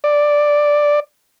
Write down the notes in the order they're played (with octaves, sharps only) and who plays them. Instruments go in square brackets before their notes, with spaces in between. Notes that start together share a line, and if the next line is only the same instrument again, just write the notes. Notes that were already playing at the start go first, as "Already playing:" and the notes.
[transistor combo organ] D5